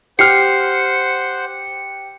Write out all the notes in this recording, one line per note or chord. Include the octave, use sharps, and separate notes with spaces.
G4 C5 F#5 F6 C7 C#7